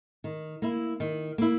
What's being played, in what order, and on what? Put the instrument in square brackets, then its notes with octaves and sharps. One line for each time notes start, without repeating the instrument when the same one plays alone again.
[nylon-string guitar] D#3
A#3 E4
D#3
A#3 E4